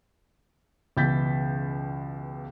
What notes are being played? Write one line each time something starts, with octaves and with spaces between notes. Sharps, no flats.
C#2 B2 E3 G6 A6 B6